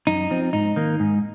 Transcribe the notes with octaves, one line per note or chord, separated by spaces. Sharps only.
F#2 D#4
F3 C4
G#2 D#4
D#3 A#3
G#2